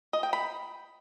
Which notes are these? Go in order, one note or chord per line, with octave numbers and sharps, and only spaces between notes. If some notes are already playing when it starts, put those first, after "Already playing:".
D#5
G5
B5